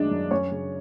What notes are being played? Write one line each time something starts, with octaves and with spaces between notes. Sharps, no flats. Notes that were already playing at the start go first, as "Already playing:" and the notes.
Already playing: F#2 D#3 G#3 D4 D5 D#5
F#2
F#2 C#4 C#5
C#3